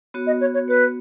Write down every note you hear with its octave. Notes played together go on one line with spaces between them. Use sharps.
B3 F#4 C#5
D#5
C#5
C#5
B3 F#4 B4 C#5